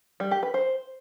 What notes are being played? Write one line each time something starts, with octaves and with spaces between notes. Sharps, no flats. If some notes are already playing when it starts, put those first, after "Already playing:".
G3
G4
B4
C5